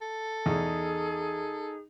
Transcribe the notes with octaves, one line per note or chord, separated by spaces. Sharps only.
A4
E2 D#4 G#4